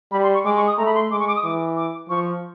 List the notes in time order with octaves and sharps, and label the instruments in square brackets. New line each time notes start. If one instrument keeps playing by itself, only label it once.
[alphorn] G3 [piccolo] B5
[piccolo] C6
C#6
[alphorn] G#3 [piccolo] D6
[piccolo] C#6
D#6
[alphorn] A3 [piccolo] A#5
[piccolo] B5
C6
[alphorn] G#3 [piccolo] D6
[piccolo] C#6
D6
D#6
[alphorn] E3 [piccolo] D6
[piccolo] D6
[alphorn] F3 [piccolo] C#6